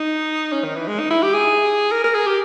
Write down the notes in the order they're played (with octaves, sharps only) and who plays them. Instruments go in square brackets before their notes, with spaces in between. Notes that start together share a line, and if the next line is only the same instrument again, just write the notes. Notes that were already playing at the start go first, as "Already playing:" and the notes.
Already playing: [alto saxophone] D#4
C#4
D#3
E3
G#3
D#4
E4
G4
G#4
A#4
A#4
G#4
G4